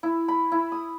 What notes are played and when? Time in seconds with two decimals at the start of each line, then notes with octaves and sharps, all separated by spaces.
0.03 E4
0.28 B5
0.52 E4
0.72 D#6